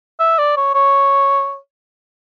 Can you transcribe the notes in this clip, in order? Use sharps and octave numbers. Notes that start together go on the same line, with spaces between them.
E5
D5
C#5
C#5